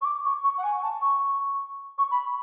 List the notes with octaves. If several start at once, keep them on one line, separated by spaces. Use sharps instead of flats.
C#6
D6
C#6
C#6
F#5
G#5
A5
C#6
C#6
B5